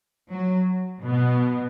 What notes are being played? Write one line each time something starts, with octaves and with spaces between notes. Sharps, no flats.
F#3
B2 B3